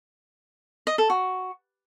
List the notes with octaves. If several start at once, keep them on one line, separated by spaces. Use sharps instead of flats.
D#5
A4
F#4